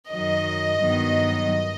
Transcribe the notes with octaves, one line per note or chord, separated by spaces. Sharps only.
F#2 D#3 F#3 D#5
G2 D#3 F#3 B3